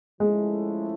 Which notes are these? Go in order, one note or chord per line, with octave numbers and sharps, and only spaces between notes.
F3 G#3 A3 C#4 E4 A4